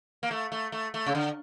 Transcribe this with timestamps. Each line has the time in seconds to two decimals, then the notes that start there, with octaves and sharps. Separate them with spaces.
0.23 A#3
0.31 A3
0.52 A3
0.72 A3
0.94 A3
1.06 C#3
1.15 D3